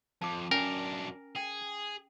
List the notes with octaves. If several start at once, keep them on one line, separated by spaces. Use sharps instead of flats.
F2 A5 D6
F#2 C#4 D4 A#4 G5 G#5
G#4 G5